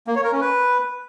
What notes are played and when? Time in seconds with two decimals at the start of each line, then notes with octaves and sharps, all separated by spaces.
0.07 A#3
0.16 C#5
0.24 A#4
0.32 C#4
0.41 B4